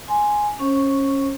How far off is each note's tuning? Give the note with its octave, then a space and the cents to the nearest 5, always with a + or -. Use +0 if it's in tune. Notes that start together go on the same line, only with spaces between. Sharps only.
G#5 +0 C6 +0
C#4 -10 C5 +45 C#6 +0